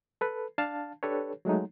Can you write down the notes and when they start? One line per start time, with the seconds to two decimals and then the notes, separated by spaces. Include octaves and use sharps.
0.21 A4 B4
0.58 D4 F5 A5
1.03 D4 G4 A4 B4 C#5
1.45 F#3 G#3 A3 D#4